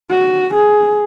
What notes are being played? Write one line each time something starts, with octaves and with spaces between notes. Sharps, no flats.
F#4
G#4